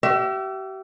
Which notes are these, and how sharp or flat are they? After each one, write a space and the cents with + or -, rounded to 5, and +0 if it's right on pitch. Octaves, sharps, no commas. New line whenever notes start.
G4 -40 E5 +25